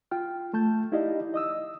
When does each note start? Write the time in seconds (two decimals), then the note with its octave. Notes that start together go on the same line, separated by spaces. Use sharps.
0.11 F4 G5 F6
0.54 A3 A5 G6
0.92 D#4 E4 G4 D5 D#5 F5
1.34 D#5 D#6 E6